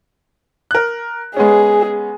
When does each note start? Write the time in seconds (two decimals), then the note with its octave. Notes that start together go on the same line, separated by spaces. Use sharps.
0.71 A#4 F#6
1.36 G#3 B3 C#4 G#4